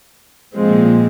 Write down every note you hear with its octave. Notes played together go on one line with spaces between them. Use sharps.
A#2 F3 G#3 C4